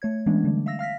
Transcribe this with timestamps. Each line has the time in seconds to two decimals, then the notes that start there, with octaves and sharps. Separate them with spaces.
0.02 A3 C#5 G#6
0.26 E3 G#3 A3 B3 C#4 D4
0.44 D3 G3 A3
0.66 E5 F5 E6 A#6
0.79 F5 F6 A#6 B6